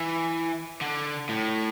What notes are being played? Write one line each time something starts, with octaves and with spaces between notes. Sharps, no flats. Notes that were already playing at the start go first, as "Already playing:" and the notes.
Already playing: E3
D3
A2